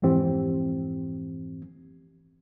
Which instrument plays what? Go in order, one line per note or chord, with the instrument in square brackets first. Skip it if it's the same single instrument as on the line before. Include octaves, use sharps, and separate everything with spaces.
[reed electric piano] F2 G#2 E3 C4 G4